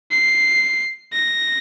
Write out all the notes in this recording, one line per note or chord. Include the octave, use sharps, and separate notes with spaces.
C7
A#6